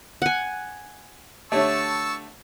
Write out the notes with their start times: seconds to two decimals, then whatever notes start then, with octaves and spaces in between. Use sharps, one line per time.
0.22 F#5 G#5
1.52 D3 A3 G4 C#5 E5 A5 C#6 E6